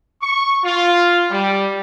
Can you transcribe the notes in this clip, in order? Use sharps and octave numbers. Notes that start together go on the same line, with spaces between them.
C#6
F4
G3